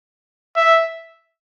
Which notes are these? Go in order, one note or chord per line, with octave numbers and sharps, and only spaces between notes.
E5